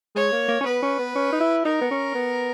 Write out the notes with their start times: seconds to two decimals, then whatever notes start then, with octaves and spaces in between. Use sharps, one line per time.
0.15 G#3 C#5
0.32 A#3
0.48 A#3
0.61 C#4
0.65 B3 B4
0.82 C#4
0.99 B3
1.15 C#4
1.32 D#4
1.40 E4
1.65 D#4 A#4
1.81 B3
1.91 C#4
2.15 B3